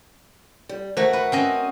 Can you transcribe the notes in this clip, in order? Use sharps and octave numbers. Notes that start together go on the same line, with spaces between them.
G3
A3 F#4 A#4 C5
B4
C4 C#4 D#5